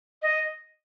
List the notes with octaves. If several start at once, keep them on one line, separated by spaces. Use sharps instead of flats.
D#5